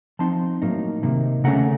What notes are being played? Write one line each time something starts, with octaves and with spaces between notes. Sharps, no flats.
F3 C4 D#4 A5 C6
A2 F#3 A#3 D#4
C3 D#3 A#3
C#3 A3 C#4 F#5 A#5